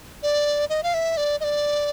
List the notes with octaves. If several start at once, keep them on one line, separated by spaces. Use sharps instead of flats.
D5
D#5
F5
E5
D5
D#5
D5